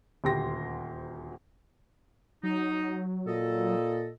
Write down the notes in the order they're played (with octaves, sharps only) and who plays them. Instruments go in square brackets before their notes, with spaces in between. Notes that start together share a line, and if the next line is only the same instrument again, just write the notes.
[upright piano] D#1 D2 G4 C6 A#6
[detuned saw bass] F#3 [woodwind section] D#4
[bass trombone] A#2 [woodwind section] A4 D#5